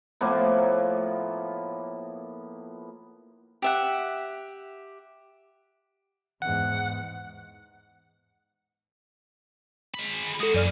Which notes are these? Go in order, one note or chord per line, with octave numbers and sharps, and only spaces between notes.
A2 F3 A#3 B3
G4 E5 F#5
E2 G#2 F#5
G#3 B5
G#3 F#4 A4 D#6
F#2 A#2 E3 D5 F6